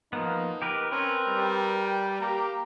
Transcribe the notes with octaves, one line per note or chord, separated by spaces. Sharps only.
F3 A#3 B3 D#4
G4 A#4 B4
C4 C#4 A#4 B4
G3
G5
A#3 G4 A#5